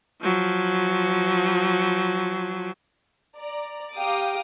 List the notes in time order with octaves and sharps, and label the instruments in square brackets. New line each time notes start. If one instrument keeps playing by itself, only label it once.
[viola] F3 F#3
[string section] D5 A#5
G4 F5 G5 A#5 D6 D#6